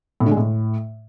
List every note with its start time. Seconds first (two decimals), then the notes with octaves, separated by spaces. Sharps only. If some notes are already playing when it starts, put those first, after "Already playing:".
0.20 A2
0.26 D3
0.31 G#3
0.37 A2